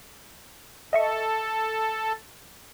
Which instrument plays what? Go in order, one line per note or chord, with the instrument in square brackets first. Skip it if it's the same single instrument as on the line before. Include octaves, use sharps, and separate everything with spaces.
[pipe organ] A4 [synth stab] D#5 E5 C#6